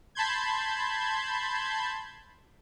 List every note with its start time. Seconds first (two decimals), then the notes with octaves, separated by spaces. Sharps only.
0.15 A5 B5 C6 G6 G#6